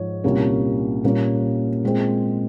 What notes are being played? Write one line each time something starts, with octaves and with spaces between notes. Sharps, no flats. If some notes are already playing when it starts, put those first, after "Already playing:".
Already playing: G#2 F3 C#5
C2 A#2 G3 A#3 C#4
A#2 G3 A#3 C#4
A#2 G#3 C4